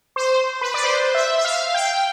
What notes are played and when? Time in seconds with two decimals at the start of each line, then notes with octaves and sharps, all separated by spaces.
0.16 C5
0.61 B4
0.74 D5
0.84 C5
1.14 E5
1.38 E5
1.44 F5
1.74 G5